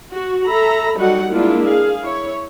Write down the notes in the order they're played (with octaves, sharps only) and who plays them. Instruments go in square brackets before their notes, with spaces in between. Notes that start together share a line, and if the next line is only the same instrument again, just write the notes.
[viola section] F#4
A4 E5 A#5 B5
F#3 G3 D#4 F#4 A4 F#5
G#3 A#3 D4 E4 F4
G#4 F5
E4 C#5